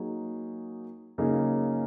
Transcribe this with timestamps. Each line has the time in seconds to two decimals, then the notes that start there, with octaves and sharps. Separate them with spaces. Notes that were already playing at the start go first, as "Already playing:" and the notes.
Already playing: F#3 A#3 D#4 G#4
1.18 F#2 C#3 A#3 D#4 G#4